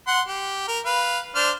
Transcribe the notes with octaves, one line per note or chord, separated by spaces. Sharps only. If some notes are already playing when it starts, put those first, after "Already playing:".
F#5 C6
G4
A#4
B4 F5
D4 C5 F6